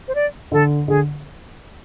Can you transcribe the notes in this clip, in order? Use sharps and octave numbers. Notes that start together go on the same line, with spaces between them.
C5
D5
D3 A4
D3 G#4